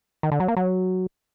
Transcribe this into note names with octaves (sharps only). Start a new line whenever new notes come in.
D#3
D3
F#3
A#3
F#3